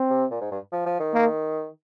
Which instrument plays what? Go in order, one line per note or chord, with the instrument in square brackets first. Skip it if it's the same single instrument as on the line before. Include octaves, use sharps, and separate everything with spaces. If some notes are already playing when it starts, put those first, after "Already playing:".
Already playing: [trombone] C4
[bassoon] C3
A#2
G#2
G2
F3
F3
D#3
[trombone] A#3